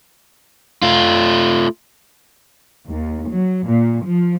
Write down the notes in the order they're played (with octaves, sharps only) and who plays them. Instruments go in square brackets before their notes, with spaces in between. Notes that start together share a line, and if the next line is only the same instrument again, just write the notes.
[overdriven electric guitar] A3 F4
[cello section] D#2
F#3
A#2
F3